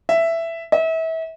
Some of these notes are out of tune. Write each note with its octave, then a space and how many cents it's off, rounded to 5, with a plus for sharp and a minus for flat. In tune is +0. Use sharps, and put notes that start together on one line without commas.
E5 +10
E5 -30